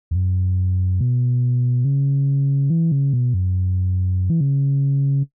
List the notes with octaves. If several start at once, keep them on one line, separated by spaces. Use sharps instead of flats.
E2
F#2
B2
C#3
E3
C#3
B2
F#2
E3
C#3